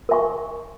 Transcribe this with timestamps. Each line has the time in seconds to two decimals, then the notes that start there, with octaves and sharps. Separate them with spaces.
0.09 A#4 E5 G#5 C#6